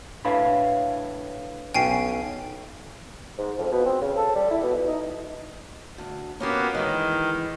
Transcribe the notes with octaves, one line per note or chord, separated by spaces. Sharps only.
A2 D4 B4 C#5 F5 B5
B1 C#4 G5 G#5 C7
G#2
F2
B2
C4
C#3
A4
G3
E4
B2
E3
D#4
D2
A#3 B3 C#4 F#4 G4
D#3 E3 G#3